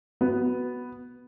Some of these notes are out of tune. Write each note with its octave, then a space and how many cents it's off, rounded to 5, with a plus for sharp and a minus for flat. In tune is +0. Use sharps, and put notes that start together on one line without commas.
B3 +0 F#4 +0